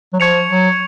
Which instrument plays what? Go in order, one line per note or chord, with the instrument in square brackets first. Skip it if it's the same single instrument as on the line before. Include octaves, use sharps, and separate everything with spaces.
[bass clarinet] F#3
[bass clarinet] F3 [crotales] C#6 G#6 C#7 F7
[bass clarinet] F#3